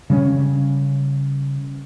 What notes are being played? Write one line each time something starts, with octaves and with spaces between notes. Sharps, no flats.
C#3 G3 C4 C#4